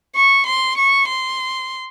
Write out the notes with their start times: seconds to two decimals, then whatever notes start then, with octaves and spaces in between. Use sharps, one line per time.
0.16 C#6
0.47 C6
0.78 C#6
1.09 C6